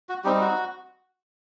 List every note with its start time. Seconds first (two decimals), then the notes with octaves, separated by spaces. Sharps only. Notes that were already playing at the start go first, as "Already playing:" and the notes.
0.09 F#4
0.24 G3 C4 D#4 G4
0.40 F#4